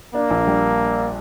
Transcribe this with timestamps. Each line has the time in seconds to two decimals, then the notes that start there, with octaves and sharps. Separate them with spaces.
0.14 A#3 D4
0.30 A#1
0.47 G3